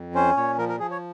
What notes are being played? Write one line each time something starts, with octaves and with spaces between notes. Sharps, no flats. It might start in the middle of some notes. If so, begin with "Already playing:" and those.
Already playing: F2
C#4 C5
A#2 C#5
F3 A#4
A#4
F3 G#4
C#5